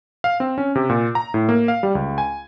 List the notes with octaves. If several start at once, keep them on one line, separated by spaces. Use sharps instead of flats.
F5
C4
C#4
C3
A#2
A#5
A2
A#3
F5
G3
C#2
G#5